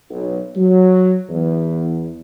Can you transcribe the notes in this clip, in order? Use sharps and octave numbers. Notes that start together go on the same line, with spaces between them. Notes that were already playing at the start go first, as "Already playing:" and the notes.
B1
F#3
E2